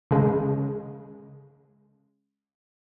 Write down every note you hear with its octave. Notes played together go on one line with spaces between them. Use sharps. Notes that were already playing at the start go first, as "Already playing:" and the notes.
C#3 G#3